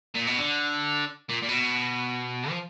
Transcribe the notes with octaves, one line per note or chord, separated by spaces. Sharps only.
A#2
B2
D3
A#2
A#2
B2
F3